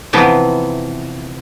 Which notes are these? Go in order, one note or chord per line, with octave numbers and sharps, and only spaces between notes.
C3 E3 F3 B3